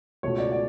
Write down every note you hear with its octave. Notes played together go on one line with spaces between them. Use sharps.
C#2 B2 A3 C#5
D5
D5